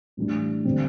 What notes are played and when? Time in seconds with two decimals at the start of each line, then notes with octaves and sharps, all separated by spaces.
0.17 A2 E3 G3 D4
0.65 D3 G3 C4